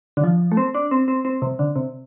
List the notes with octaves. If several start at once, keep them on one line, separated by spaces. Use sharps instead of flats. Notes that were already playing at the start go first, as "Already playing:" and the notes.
D3
F3
A3
C4
D4
C4
C4
C4
C3
D3
C3